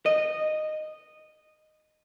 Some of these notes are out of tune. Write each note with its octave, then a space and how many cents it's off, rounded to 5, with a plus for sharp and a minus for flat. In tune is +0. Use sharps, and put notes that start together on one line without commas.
D#5 -10